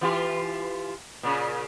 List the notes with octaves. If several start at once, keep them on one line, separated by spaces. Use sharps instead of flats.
E3 F4 G4
A#2 C#3